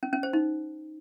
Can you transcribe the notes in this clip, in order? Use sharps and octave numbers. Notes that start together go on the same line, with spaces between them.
C#4
C#4
C5
D#4